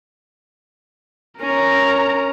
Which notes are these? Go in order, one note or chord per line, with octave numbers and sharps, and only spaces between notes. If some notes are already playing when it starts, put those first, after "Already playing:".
C#4 A#4 A#5